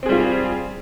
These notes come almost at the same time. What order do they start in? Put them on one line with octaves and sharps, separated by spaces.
C4 G#4 G3 F4